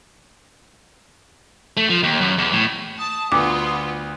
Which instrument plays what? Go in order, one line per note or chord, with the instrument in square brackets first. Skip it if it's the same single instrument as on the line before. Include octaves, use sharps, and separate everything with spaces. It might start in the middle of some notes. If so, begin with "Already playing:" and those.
[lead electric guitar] A3
F3
D#2
F#2
E2
A2
[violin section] A5 [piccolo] D#6
[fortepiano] D2 [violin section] B3 F4 [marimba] D6